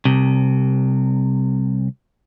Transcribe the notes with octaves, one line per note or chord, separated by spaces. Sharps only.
C2 C3